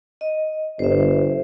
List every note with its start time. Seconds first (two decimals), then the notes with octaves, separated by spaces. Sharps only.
0.21 D#5
0.79 G1 C5 E5